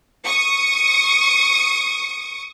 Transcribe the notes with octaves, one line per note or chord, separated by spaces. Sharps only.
C#6 D#6 C#7